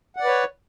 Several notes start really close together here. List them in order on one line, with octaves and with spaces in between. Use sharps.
F#5 D5 B4 C#5